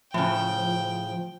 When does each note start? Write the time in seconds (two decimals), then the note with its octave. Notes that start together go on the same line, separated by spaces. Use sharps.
0.14 A2 C#3 F3 G5